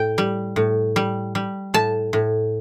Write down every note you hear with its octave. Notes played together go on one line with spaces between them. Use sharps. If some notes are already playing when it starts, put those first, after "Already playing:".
Already playing: A2 G5
G3
A2
G3
G3
A2 A5
A2